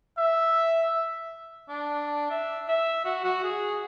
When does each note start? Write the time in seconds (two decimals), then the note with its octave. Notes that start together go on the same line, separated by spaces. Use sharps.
0.18 E5
1.69 D4
2.30 E5
2.68 E5
3.05 F#4
3.24 F#4
3.44 G#4